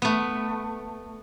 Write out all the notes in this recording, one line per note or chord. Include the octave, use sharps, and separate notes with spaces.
A3 B3